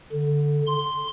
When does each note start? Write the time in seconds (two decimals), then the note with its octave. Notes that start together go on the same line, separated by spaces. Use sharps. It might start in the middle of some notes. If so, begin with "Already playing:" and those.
0.13 D3
0.67 C6